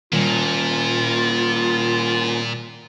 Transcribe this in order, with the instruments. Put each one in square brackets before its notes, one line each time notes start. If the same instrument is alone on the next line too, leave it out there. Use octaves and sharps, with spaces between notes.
[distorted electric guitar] A#2 [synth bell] D#3 G3 [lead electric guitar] A#3 C#4 [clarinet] F4